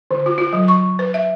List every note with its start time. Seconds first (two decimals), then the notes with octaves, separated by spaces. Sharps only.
0.11 D3
0.26 F4
0.38 F4
0.53 F#3
0.68 C#6
0.99 B4
1.14 E5